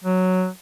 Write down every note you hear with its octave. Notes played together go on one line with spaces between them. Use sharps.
F#3